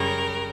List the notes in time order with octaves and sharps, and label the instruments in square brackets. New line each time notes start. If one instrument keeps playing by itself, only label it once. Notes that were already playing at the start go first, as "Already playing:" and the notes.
Already playing: [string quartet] F#2 C#3 G3 A#4